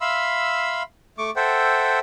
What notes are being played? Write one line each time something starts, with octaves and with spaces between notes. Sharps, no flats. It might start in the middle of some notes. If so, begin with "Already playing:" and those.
E5 F5 B5 C6 E6
A3 C#6 D6
A4 C5 E5 F#5 G5